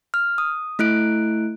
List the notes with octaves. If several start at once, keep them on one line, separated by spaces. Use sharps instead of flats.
F6
D#6
A3 E4 F#6 D7